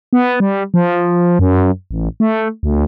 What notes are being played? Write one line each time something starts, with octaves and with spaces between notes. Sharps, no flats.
B3
G3
F3
F#2
A1
A3
D2